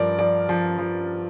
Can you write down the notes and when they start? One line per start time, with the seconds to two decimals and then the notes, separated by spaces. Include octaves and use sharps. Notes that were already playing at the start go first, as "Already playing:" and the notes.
Already playing: G2 F3 A#4 D5
0.19 F3 D5
0.49 F3
0.78 F3